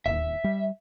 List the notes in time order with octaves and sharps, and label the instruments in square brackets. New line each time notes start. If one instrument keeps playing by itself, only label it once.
[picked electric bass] D1 D#2 [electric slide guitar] E5
[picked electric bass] G3